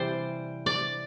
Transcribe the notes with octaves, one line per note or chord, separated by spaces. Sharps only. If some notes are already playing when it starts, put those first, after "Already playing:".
Already playing: C3 E3 G3 C5 D5
D5